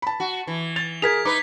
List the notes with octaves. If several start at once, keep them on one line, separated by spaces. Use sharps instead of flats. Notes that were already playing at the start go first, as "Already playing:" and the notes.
A5 B5
F#4
E3
A6 F7
G#4 A#4 G#6 B6 F7
D#4 B4 D6